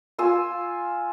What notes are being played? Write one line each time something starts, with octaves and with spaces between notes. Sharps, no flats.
F4 G#5 E6